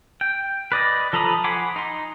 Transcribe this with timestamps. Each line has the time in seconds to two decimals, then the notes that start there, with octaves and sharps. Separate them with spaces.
0.21 G5
0.72 B4 D5 D#5
1.13 F3 A4 A#5 B5 D#6
1.44 F#5 G#5 B5 C6 D6
1.76 D#4 C6